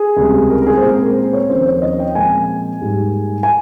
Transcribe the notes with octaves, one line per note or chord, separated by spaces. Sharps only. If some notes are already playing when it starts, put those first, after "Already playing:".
Already playing: G#4
C#2 C3 G3
A#4
A#4
G#4
C5
A#2 G#3 C4 A#4
C5
C#5
D#2 C#3 F3 C4 C5
C5
C#5
D#5
G5
A#2 F3 G#3 C4 G#5
G#2 G3 A#3
G#5